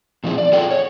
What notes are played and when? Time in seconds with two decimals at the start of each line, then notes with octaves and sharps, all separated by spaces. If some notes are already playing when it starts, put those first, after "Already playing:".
0.24 A#2 D#3 F3 C4 E4 G#4
0.38 D5
0.52 F4 G#4 A4 F#5 G5
0.71 C#5